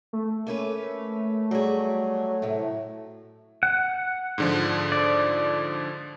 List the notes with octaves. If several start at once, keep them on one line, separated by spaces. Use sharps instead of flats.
A3
A#3 C#4 B4
F#3 G3 G#4
A2 C3
F#5
G#2 D3 F3
D5